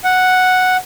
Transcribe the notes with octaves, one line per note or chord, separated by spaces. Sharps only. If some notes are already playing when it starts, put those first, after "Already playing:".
F#5